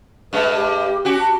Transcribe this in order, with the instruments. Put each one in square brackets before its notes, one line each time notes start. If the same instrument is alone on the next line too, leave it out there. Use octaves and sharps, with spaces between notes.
[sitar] G2 G#3 [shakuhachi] B4
[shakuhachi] G4
[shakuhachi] C#4 [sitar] F#4 G4
[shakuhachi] A5